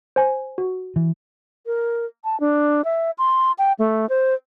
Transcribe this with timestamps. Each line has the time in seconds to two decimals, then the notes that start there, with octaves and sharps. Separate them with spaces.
0.16 C5 G#5
0.58 F#4
0.96 E3
1.66 A#4
2.24 A5
2.40 D4
2.85 E5
3.18 C6
3.58 G5
3.79 A3
4.09 C5